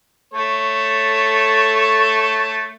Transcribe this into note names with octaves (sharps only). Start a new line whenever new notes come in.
A3 A4 C#5